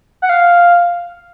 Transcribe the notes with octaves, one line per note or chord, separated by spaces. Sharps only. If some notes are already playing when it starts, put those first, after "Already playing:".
F#5
F5